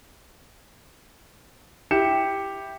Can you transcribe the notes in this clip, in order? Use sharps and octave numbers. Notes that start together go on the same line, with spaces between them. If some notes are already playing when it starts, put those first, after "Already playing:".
E4 G4 C#7 E7